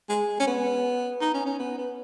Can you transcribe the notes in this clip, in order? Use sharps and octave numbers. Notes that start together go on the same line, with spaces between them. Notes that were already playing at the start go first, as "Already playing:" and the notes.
G#3
C#4
B3
D#4
C#4
C#4
B3
B3